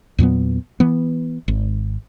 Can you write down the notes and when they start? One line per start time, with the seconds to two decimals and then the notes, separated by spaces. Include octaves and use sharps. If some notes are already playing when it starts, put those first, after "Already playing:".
0.18 E2 A#2 F#3 B3
0.80 E3 B3
1.48 G#1